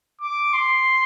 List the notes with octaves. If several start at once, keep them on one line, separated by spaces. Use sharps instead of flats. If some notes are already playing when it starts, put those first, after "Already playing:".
D6
C6